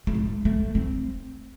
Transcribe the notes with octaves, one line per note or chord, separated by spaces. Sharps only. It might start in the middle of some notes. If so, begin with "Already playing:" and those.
A3
G#3
A3
C4